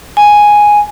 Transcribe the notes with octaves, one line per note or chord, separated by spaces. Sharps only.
G#5